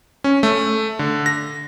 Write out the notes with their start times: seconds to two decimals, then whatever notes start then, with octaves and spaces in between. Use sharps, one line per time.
0.24 C#4
0.43 A3
0.99 D3
1.26 A#6